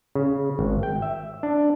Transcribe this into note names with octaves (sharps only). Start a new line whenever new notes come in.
C#3
G#1
G5
E5
D4